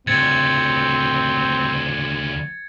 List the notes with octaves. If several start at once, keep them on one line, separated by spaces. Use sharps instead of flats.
D2 C#3 C4 G#6 A6 C#7